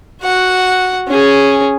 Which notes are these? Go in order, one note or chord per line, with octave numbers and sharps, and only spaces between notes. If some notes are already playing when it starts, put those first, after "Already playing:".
F#4 F#5
C#4 G#4